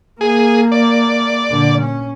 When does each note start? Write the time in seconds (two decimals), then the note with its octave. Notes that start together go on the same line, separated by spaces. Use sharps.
0.21 A#3 G#4
0.72 D5
1.49 A#2 D3
1.81 C#4